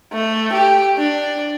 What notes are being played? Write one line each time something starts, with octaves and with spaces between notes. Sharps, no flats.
A3
G4
D4